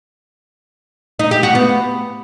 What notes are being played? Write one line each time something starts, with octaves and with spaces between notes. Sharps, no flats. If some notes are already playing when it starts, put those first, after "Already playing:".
D#4
G4
F#4
B3